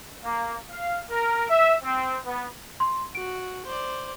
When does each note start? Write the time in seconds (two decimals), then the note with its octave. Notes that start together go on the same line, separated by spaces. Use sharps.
0.25 A#3
0.71 F5
1.11 A#4
1.49 E5
1.84 C4
2.25 B3
2.80 C6
3.15 F#4 D7
3.66 C5 D5